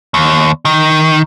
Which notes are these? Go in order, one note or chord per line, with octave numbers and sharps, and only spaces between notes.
D#2
D#3